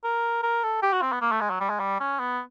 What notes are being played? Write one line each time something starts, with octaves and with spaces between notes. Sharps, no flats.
A#4
A#4
A4
G4
F#4
C4
B3
A#3
A3
G#3
F#3
G3
G#3
G3
C#4
B3